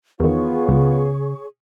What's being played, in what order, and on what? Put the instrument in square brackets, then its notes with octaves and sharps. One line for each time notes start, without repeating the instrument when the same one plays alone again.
[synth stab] E2 D#3 [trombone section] B3 F4 [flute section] G#4 C#5 C#6
[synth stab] C#2 [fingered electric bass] C#3